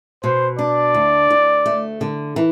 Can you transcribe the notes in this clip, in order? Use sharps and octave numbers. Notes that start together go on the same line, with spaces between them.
B2 C5
D4 D5
D2
D2
A3
D3
E3